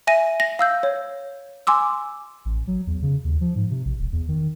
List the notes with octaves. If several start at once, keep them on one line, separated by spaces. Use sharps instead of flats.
E5 G#5 A#6 D#7
A#6
F5 E6 G6
C#5
G#5 C6 D6 E6
A1
F#3
E2
C#3
D#2
F3
G#2
C3
A#1
E1
E2
D#3